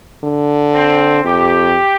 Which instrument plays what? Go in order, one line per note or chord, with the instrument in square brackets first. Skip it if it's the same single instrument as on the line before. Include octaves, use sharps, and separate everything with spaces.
[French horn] D3
[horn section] C4
[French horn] F2 [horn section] G4